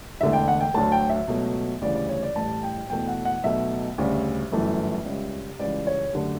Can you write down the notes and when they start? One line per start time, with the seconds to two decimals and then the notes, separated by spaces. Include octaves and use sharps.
0.20 E1 E2 D3 A3 E5
0.33 G5
0.48 F#5
0.60 G5
0.74 D2 D3 F#3 A3 A5
0.92 G5
1.09 E5
1.28 C#2 B2 F#3 A3
1.82 D2 C#3 E3 G3 D5
1.95 D5
2.09 C#5
2.23 D5
2.35 A1 A2 G3 A5
2.63 G5
2.90 E2 B2 A3 G5
3.07 F#5
3.25 F#5
3.44 B1 B2 A3 E5
3.98 D2 C#3 G3
4.52 G1 F#2 E3 A3
5.05 C#2 C#3 G3
5.59 C#2 C#3 E3 G3 D5
5.87 C#5
6.13 F#2 D3 A3 G4